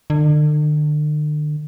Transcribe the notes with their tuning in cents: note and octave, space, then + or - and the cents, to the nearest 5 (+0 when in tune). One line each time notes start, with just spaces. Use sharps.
D3 +40